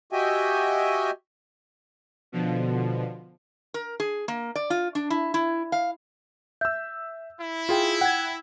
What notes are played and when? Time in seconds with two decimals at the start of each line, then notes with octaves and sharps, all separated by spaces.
0.13 F#4 G4 D#5 E5 G5 G#5
2.32 B2 D3 F3
3.74 A#4
4.00 G#4
4.28 A#3
4.55 D5
4.70 F4
4.95 D4
5.10 E4
5.34 E4
5.72 F5
6.61 E5 E6 G6
7.39 E4
7.69 F4 G#4 G5
8.01 F#5 G5 G#6